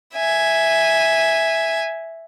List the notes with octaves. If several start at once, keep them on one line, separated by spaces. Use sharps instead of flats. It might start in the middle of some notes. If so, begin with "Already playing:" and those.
E5 G#5